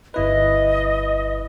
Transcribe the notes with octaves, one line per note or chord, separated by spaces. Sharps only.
G1 E4 B4 D#5